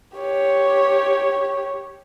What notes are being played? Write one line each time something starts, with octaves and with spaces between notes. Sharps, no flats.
G4 C#5